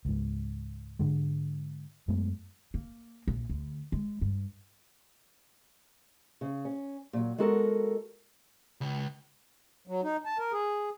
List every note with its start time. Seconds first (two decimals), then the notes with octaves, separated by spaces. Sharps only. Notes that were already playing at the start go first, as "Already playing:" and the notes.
0.05 C#2 G#2
0.99 G#2 D3 G#3
2.08 F#2 G#3 A3 B3
2.74 A#3
3.28 A#1
3.49 D2
3.92 G#3
4.21 G2
6.41 C#3
6.65 C#4
7.13 A#2 F#3
7.38 G#3 B3 F#4 A4 A#4
8.81 C#2
9.88 F#3
10.03 D#4
10.25 A5
10.39 A#4
10.53 G#4